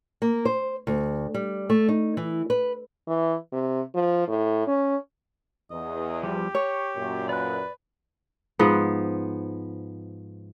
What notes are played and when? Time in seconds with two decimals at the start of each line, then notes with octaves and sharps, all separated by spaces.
0.22 A#3
0.45 C5
0.87 D2
1.34 G3
1.70 A3
1.89 D#4
2.17 E3
2.50 B4
3.07 E3
3.52 C3
3.95 F3
4.28 A2
4.68 C#4
5.71 E2 D#5
6.23 F3 G3 G4
6.55 C#5 C#6
6.96 F#2 A#2
7.29 B4 D5 F#6
8.59 G#2 F3 B3